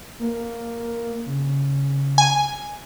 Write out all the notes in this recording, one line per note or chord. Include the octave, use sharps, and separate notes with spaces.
A#3
C#3
G#5